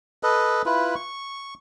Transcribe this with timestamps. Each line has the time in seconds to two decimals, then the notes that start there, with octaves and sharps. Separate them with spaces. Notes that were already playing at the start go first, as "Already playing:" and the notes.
0.23 A4 B4 D#5
0.66 E4 F4 B4
0.95 C#6